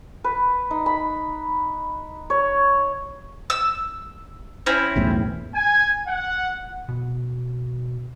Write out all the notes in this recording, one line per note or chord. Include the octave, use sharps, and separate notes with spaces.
B4
D#4
B5
C#5
E6
C4 C#4 E4
B1 E2 A2
G#5
F#5
B2